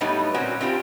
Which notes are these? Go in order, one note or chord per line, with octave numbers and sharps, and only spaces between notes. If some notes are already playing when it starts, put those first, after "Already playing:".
A2 F#3 G3 B3 D#4
A#2 C4 C#4 F#4
C4 D4 F4 G4